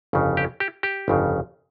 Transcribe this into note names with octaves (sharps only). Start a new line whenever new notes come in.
G1 F2 C#3
G4
G4
G4
G1 F2 C#3